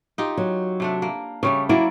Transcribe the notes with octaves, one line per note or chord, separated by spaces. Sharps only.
D#4 F4 G4
F#3
C3 A3 D4
A#3
C#3 G3 A3 C#5
F#3 A#3 E4 D5